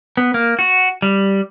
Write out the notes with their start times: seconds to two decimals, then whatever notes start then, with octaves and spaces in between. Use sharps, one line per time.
0.17 B3
0.34 A#3
0.59 F#4
1.02 G3